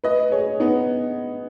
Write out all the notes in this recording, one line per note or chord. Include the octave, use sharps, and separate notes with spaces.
B4 D#5
G#4 C#5
B3 D#4